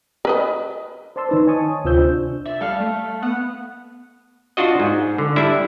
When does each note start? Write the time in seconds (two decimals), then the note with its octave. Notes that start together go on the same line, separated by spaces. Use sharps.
0.25 A#4 B4 D#5
1.16 C5 D5 A5 C6 E6
1.29 D#3 D#4 B4
1.46 C#5 D#5 G#5 A5 C#6 D#6
1.84 D2 C3 F4 C5 E6 G6
1.99 D4
2.46 D5 E5
2.61 G3 A4 F5
2.80 A3
3.22 B3 F#5
4.57 D4 F4 F#4 D#5
4.80 G#2
5.18 D3
5.36 G3 D4 E4 E5